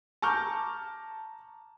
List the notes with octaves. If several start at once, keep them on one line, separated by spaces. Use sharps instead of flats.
A5 A#5 C#6 D6 F6 G6